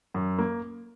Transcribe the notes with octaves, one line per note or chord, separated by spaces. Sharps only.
F#2
A#3